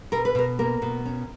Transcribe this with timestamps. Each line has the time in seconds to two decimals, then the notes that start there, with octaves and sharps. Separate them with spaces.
0.12 B2 A#4
0.25 B4
0.35 B2 A#4
0.59 A#3 A#4
0.82 B2
1.06 C#4